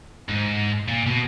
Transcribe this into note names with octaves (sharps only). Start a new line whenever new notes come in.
G#2
A#2
B2